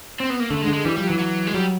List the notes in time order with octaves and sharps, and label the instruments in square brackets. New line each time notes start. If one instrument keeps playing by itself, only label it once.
[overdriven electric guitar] C4
B3
A#3
[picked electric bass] D3 [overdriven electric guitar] A3
[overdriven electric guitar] G#3
[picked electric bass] D3
[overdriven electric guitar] G#3
[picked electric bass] E3 [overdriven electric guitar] G3
[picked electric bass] F3 [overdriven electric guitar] G3
[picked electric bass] E3 [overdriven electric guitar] F#3
[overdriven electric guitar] F#3
G#3
[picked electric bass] F#3 [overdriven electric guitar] G3